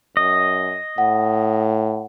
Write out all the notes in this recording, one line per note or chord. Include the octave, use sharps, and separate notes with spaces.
F#2 D#5
A2 F#5